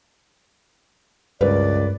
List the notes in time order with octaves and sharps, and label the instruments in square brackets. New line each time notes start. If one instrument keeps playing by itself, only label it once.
[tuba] C#2 [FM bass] G2 [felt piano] A#4 B4 [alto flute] D5